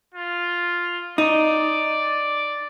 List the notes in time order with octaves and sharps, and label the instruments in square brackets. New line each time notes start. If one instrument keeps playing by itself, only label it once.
[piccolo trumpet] F4
[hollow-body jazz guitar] D#4 [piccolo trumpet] D5